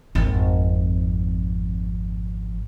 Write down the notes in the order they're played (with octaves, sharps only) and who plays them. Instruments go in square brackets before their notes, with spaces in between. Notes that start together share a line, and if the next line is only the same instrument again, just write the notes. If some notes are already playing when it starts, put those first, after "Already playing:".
[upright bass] G#1 F2